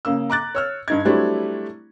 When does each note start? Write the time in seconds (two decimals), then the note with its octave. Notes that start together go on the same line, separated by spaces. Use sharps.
0.05 C#3 A#3 E6
0.30 A#5 D6 F#6 A6
0.55 C#5 E6 F6
0.88 G2 D#4 G#6
1.05 F#3 G3 A3 C4 D4 E4